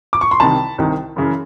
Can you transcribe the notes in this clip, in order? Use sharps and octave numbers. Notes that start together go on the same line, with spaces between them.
D6
C#6
C6
C2 C3 D#3 A5 B5
C2 C3 D#3
F#2 C#3 E3